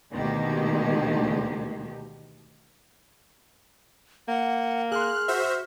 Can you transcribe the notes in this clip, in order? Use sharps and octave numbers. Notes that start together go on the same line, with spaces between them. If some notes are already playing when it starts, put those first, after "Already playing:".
D2 B2 D#3 G#3 A#3 G4
A#3 F#5
G#4 C6 F6 F#6
F#4 C5 E5